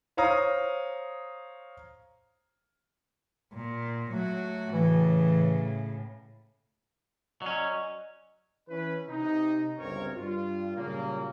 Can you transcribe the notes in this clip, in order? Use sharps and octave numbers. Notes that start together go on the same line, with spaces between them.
C5 C#5 F5 A#5 D#6
A#2
F#3 A3 F#4
A2 C#3 E3
F#3 C#4 D5 D#5
E3 C#4 E4 B4
C3 D#4
G1 C#2 G2 C4 A#4 C#5
G2 F4
A#2 C#3 F#3 G3 A#3